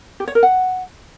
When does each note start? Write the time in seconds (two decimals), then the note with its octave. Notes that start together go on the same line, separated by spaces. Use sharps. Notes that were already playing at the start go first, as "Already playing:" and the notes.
0.20 G4
0.28 C#5
0.35 A#4
0.43 F#5